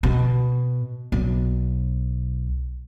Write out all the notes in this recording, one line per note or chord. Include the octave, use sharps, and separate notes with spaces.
B2
B1